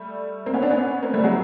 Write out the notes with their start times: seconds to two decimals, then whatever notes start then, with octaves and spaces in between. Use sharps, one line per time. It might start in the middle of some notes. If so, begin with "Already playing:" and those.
Already playing: G3 A3
0.46 A#3 C4
0.54 B3 C#4
0.62 C4 D4
0.70 B3 C#4
1.03 A#3 C4
1.14 G3 A3
1.24 F#3 G#3